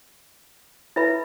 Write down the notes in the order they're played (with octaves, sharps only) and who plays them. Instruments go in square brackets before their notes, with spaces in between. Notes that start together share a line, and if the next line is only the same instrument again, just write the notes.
[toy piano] E4 B4 E5 B5